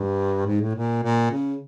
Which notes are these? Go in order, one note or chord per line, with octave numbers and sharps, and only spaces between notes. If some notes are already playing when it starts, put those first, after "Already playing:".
Already playing: G2
G#2
A2
A#2
A#2
C#3